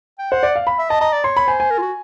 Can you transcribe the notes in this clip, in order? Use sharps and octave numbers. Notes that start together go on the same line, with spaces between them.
G5
C5 F#5
D5
F5
B5
E5
D#5 A5
D#5 A#5
D5
C#5 C6
B5
C5 G#5
G#5
A#4
F4
F#4